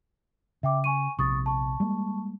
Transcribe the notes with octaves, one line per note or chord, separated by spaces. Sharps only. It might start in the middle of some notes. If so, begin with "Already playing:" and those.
C#3 E5 G5 D6
G#5 C#6 D#7
A#1 C3 C#6 D#6 A6
A5 C#6
G3 G#3 A#3